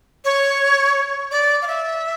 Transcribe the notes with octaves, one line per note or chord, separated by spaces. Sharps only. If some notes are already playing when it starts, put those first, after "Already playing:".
C#5
D5
F5
E5